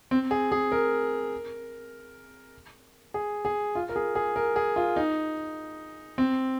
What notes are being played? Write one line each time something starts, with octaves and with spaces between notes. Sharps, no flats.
C4
G#4
G#4
A#4
G#4
G#4
F4
A#4
G#4
G#4
A#4
G#4
F4
D#4
C4